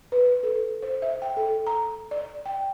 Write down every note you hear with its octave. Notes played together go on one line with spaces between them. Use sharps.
B4
A4
C5
E5
G5
A4
A#5
D5
G5